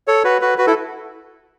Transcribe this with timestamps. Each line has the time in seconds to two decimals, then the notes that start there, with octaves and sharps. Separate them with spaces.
0.07 A4 C#5
0.24 F#4 B4
0.41 F#4 B4
0.58 F#4 B4
0.67 E4 A4